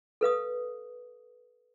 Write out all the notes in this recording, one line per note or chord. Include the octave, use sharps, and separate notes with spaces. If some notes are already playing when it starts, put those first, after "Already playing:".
A4 B4 F5 D#6